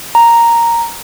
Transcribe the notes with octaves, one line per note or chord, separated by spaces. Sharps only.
A#5